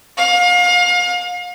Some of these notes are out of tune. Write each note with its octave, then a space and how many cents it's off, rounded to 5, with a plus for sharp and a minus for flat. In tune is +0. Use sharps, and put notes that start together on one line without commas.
F5 +35